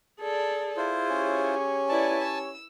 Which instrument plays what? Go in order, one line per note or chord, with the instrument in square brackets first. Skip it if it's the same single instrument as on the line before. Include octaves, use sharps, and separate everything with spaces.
[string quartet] G#4 A4 D5
[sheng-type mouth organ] E4 F4 C5 [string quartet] G#4
[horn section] C#4 G4 C#5
[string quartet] E4 B4 D5 [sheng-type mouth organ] G#5 A5
[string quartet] E6